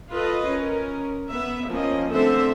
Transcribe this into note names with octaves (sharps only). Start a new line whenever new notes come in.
F4 A4 B4 D#5
C#4 A#4
B3 E5
F3 A#3 C#4 D#5
D3 A3 C4 A4 C5 E5